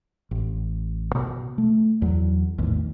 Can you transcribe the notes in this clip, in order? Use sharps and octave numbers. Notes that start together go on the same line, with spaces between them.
A1
B2
A3
E2 F#3
A#1 E2 A2 D#3